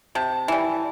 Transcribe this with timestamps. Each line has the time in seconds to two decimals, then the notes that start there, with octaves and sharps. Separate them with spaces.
0.15 C3 A5
0.48 E3 G3 G#5